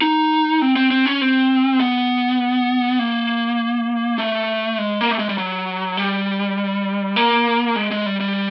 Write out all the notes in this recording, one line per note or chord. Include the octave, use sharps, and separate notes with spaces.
D#4
C4
C4
C4
C#4
C4
B3
A#3
A3
G#3
A#3
A3
G#3
G3
F#3
G3
A#3
G#3
G#3
G3
G3